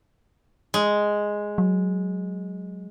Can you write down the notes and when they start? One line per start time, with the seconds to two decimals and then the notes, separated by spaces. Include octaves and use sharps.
0.74 G#3
1.58 F#3